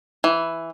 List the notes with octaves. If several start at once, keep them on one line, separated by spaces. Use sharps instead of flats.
E3